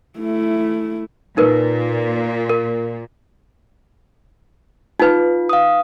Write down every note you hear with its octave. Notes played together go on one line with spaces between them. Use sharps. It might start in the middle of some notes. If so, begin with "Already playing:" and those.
A3 E4
A#2 D#4 A#4 B4
A#4
D#4 F4 B4
F5 D#6